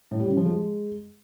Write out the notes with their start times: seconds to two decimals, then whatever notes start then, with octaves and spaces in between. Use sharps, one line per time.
0.11 A2
0.20 G3
0.28 C#3
0.37 F3
0.46 G#3